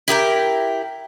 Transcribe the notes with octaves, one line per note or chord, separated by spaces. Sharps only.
E4 G4 A#4 G5